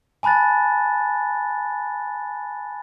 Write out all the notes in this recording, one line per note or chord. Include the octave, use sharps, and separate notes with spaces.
G#5 A5 B5 F#6 A6